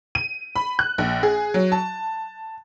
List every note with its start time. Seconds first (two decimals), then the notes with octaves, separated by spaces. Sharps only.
0.15 D#7
0.56 B5
0.79 F#6
0.98 A#1
1.23 G#4
1.54 F#3
1.72 A5